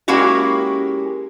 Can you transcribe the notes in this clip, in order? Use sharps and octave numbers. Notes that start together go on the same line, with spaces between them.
G#3 A#3 C#4 E4 F#4 G4